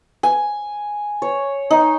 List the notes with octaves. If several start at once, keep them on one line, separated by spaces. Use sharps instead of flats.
G#5
C#5
D#4